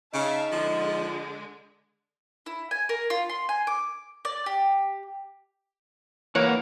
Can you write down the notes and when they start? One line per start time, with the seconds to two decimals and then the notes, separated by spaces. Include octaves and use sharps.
0.13 C#3 D#4 E5 F5 A5
0.52 D3 F3 G#3
2.46 E4
2.71 G#5
2.89 A#4
3.10 F4
3.29 C6
3.49 G#5
3.67 D6
4.25 D5
4.46 G4
6.35 E3 A#3 A#4 C#5 F#5